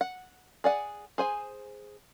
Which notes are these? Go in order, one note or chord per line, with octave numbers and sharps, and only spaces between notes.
F#5
G#4 D5 F#5
G#4 C5 G#5